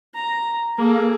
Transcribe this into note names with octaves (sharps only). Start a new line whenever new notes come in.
A#5
A#3 G#4 A4